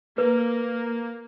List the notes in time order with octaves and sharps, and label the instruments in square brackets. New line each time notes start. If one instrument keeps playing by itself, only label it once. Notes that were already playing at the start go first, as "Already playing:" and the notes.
[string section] A#3 [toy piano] B4